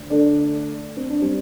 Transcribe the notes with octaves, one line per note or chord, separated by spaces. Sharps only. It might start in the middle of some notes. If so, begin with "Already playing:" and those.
Already playing: D2 D3
A3 D4
C4
D4
G3 C4